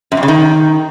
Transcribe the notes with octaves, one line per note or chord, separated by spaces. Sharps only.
F#2
F2
C#3
D#3